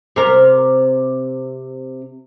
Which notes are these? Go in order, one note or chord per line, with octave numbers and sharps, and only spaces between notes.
C3 A#4